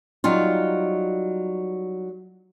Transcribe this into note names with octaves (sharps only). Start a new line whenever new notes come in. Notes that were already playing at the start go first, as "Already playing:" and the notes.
F#3 G3 D#4 F4